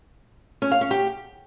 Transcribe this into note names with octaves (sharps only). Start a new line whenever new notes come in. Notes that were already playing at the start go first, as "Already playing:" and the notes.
C#4
F5
C#4
G4